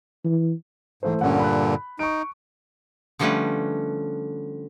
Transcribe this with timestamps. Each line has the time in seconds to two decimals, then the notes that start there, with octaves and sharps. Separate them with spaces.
0.25 E3
1.03 G#2 E3 A3 C5
1.21 G2 A#2 D3 C#4 F#5
1.40 B5 F#6
1.99 D#4 C#6 D7
3.19 D3 F3 G3 A3 C#4 B4